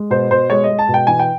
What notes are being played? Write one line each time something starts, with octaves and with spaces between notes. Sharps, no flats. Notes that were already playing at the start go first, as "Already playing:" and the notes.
Already playing: G#3
B2 C5
B2 C5
G#3 C#5
D#5
G#3
A5
B2
G5
E3 G#5
G5